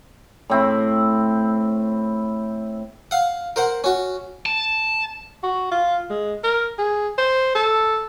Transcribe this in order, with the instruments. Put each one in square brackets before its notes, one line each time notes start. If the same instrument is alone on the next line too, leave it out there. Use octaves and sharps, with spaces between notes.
[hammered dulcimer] A2 C4 E4
[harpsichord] F5 F#5
A#4 C5 F#5
C#4 F#4
[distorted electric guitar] A5
[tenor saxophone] F#4
F4
G#3
A#4
G#4
C5
A4